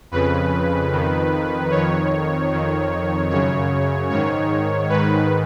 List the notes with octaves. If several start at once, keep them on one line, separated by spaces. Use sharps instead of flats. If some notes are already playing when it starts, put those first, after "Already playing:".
F2 C#3 B4
F2 D#3
F2 D#3 C#5
F2 D#3
F#2 C#3 C#5
G#2 D#3 C#5
G#2 D#3 B4